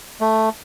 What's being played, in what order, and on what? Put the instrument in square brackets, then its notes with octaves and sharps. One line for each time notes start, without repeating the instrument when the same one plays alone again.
[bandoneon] A3